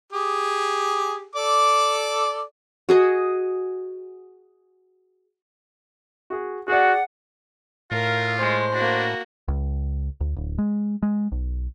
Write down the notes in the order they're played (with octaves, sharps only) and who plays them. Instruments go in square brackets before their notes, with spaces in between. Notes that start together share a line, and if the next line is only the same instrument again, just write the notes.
[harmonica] G4 G#4
A4 D5 D6
[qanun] F#4 G#4 D#5
[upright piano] F#4 G#4
[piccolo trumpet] F#4 [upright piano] G#4 D5 [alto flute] F#5
[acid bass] A2 [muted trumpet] F4 [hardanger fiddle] A#4 [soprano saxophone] F5
[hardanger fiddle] G#3 [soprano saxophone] C5
[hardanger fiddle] A#3 F#4 [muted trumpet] D4
[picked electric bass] C#2
D2
D1
G#3
G#3
B1